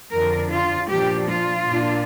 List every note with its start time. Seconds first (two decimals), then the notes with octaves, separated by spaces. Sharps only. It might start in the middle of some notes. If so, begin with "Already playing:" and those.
0.12 F2 D3 F3 D4 A#4
0.52 F4
0.89 A#2 F3 D4 G4
1.29 F4
1.67 A#2 A#3 D4